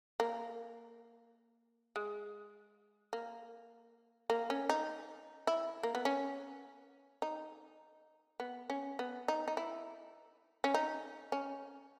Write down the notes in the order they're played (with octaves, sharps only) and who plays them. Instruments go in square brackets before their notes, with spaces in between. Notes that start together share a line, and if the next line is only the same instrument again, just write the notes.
[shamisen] A#3
G#3
A#3
A#3
C#4
D#4
E4
A#3
B3
C#4
D#4
B3
C#4
B3
D#4
D#4
E4
C#4
D#4
C#4